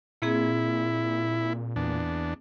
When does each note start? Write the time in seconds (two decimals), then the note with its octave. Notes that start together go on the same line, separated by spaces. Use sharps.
0.22 A#2 A#3 C4 E4 G#4
1.76 E2 D4